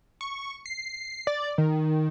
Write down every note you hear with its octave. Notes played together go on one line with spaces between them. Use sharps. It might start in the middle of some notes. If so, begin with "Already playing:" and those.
C#6
C7
D5
D#3